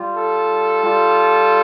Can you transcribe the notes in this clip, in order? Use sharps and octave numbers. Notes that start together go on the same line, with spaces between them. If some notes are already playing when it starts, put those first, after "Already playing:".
Already playing: G3 F4
A4
G3 F4